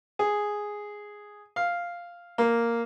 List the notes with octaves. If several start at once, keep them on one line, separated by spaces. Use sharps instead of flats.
G#4
F5
A#3